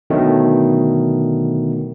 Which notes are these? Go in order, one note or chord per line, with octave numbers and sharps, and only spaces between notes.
B2 D3 D#3 F#3 A3